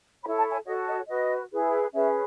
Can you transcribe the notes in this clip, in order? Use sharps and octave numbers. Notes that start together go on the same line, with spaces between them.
E4 A4 C#5 B5
A5
G#5
F#4 A4 C#5 D#5
D#5
F#4 B4 D#5
E4 G#4 B4
C#4 G#4 B4 E5